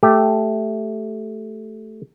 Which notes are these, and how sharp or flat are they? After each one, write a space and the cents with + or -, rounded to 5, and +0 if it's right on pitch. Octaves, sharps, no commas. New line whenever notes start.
A3 +0 G4 +0